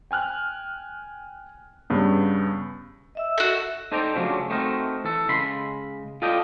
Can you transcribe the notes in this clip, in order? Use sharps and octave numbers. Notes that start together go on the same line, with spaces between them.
G5 G#5 F6 F#6
G2 C#3 B3
D#5 E5 E6
F#4 A4
D#4 A4 C5 D5 G5 A#5
C#3 F3 F#3 A3 C#4 D4
A3 C4 D#4 F#4 A#4
E3 A4
C#3 G#3 B5 C6
F4 A4 D5 D#5 G5